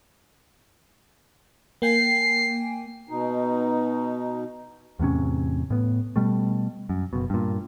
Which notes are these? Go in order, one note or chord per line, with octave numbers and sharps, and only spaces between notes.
A#3 G5 G#5 C7
B2 D#4
E2 A2 C3 C#4
A2 B3
B2 G3 A3
F#2
F#1 B2
G2 A#2